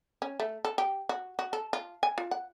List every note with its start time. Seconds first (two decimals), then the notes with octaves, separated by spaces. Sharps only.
0.22 C#4
0.40 A3
0.65 A4
0.78 G4
1.09 F#4
1.39 F#4
1.53 A4
1.73 F4
2.03 G#5
2.18 F4
2.31 F#5